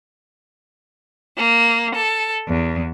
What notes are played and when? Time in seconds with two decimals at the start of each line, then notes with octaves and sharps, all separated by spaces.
1.38 A#3
1.95 A4
2.49 E2